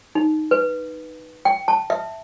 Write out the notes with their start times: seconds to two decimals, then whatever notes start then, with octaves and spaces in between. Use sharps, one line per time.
0.15 D#4
0.51 B4
1.45 G5
1.68 A5
1.90 E5